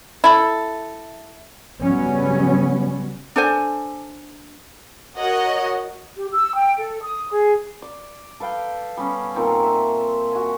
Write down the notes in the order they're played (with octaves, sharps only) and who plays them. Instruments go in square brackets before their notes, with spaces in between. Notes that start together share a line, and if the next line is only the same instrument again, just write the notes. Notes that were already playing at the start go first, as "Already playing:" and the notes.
[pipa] E4 A4
[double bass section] C#3 F#3 G3 B3 C#4
[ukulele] D4 A4 C5 G#5
[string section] F#4 A#4 C#5 D#5 F#5
[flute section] G4
E6
G5
A4
D#6
G#4
[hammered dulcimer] D5
A4 B4 F5 G5
G3 B3 C#4
A#2 D#3 C4 A4
E5
F#4 G#5